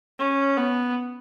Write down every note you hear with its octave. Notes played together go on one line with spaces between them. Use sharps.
C#4
B3